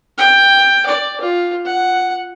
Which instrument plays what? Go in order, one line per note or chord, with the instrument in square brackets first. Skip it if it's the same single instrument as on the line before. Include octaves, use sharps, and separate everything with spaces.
[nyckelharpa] G5
D5
F4
F#5